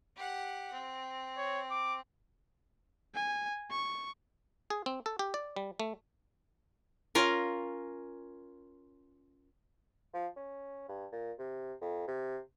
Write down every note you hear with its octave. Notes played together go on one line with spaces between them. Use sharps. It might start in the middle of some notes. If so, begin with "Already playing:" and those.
G4 F#5
C4
C#5
D6
G#5
C#6
G#4
C4
A4
G4
D5
G3
A3
C#4 F4 A#4
F3
C#4
G2
A#2
C3
F2
C3